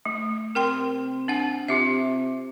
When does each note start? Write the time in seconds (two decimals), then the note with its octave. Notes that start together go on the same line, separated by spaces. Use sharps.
0.05 A3
0.55 C3 A#4 G5 C6
1.28 D4 F#5 G#5
1.68 C3 F4 G4 E5